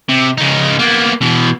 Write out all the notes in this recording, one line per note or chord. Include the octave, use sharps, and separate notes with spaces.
C3
C#3 D#4
A#3 B3
B2 E3